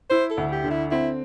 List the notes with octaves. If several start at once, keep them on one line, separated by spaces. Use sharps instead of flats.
E4 C5
A4
D2
G4
D3
E4
C4 E4